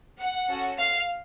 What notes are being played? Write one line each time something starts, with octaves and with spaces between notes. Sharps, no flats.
F#5
C#4 F#4 A4
F5